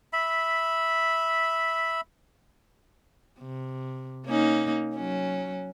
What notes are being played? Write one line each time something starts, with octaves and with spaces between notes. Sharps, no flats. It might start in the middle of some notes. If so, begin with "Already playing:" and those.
E5 B5
C3
A#3 C#4 D#4
F#3 C#4